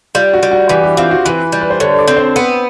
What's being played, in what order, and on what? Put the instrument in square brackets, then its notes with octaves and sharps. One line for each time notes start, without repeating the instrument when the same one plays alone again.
[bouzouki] G3 [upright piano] F4
[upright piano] F#4
[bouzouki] G3
[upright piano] F#4
[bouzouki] E3 [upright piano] G4
[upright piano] G4
[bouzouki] C4 [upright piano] F4
[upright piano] F#4
[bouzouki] E3 [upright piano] B4
[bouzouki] G3
[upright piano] B4
C5
[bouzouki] D3 [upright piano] C#5
[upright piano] D5
[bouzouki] C4
[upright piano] C5
[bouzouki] B3 [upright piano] B4